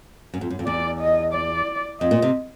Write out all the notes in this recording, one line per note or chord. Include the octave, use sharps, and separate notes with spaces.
F#2
F2
F#2
F2
E2 D5
D#5
D5
F2 D#5
A#2
C3